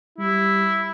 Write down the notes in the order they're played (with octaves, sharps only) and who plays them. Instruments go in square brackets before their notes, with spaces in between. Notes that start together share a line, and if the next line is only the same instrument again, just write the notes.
[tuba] G3 [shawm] E4